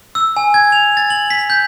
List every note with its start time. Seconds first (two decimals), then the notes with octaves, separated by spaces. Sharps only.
0.15 E6
0.37 G#5
0.54 G#6
0.72 F7
0.97 A6
1.10 F#7
1.30 B6
1.50 G6